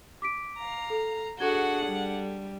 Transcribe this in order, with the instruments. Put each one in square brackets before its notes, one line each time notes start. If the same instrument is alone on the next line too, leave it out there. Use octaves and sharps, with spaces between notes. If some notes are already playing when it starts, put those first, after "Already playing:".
[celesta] D6 B6 D7
[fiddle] F5 A#5
[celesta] A4
[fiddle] D4 F#5 [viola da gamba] F#4 G#4 [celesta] A4 G#6 G7
[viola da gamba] G3